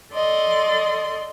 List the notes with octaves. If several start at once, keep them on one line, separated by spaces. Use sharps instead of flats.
A4 D5 D#5 C6